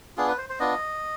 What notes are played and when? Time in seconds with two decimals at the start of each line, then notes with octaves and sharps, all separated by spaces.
0.17 B3 D4 F4 G#4
0.28 B4
0.38 C5
0.50 C5
0.59 B3 D4 F4 D#5